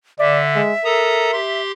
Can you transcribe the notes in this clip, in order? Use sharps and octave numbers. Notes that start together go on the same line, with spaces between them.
D3 D5 E5
G#3
A4 A#4 A#5 D#6
G4 C6